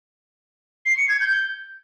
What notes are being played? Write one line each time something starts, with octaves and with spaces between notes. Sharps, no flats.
C7
C#7
G#6
G6